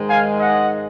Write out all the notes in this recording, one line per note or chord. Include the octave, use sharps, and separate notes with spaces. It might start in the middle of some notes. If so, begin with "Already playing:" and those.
Already playing: G#2 D#3 G#3
F5 G#5
D#5 F#5